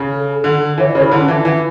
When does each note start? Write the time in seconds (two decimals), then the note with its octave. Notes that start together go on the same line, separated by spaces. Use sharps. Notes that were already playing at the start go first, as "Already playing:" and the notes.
Already playing: C#3
0.10 A4
0.44 D3
0.78 E3 C#5
0.87 D5
0.95 C#3 C#5
1.02 E4
1.11 D3 D4
1.20 C#4
1.28 E3 D4
1.45 E3